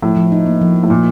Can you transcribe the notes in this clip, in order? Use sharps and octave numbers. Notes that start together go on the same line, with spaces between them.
A2 F3
F3
D#4
A#3
F3
F3
A2
A#2 F3